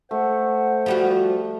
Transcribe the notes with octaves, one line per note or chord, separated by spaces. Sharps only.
A3 C5 F#5
F3 G3 F#4